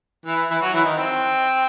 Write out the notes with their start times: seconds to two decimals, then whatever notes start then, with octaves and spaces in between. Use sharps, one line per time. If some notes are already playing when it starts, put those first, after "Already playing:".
0.26 E3 E4
0.50 E3 E4
0.61 F#3 F#4
0.74 E3 E4
0.84 D#3 D#4
0.96 C4